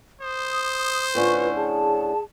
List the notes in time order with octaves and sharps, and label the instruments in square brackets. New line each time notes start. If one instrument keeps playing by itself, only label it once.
[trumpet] C5 [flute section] D#6
[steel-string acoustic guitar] A2 D3 C#4 [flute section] F4 B4 C#6
[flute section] G#4 A5